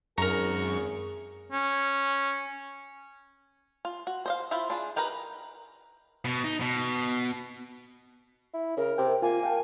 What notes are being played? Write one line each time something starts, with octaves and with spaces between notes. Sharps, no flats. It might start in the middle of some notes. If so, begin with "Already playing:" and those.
G#1 F#2 G#4 A#4 A#5 C#6
C#4
F4
F#4
C5 D#5 F5
E4 F4 C5 E5
D4 F4 G#4
D#4 G4 A#4 B4 A#5
B2
D#4
B2
E4
C#3 A#4
C3 G5
A#3 F4 G#5
F5 G5 A5